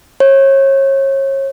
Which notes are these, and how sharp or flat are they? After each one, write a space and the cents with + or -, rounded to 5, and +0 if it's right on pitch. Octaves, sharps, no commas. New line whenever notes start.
C#5 -35